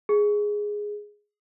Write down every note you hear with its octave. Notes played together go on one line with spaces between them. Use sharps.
G#4